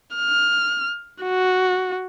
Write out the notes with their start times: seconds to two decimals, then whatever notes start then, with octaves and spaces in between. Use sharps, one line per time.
0.15 F6
1.23 F#4